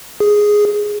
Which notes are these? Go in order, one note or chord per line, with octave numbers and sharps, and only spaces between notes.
G#4